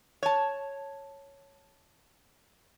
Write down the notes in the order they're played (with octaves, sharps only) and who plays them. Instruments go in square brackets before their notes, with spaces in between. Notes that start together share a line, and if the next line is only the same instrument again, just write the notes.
[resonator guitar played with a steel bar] C#5 A5